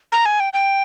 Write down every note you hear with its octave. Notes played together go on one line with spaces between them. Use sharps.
A#5
G#5
G5
G5